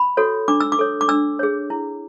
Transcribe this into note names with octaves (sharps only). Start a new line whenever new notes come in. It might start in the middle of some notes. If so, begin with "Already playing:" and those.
Already playing: B5
F#4 A4 C#5
D4 D6
E6
D6
A4 C#5
D6
D4 E6
G#4 C#5
E4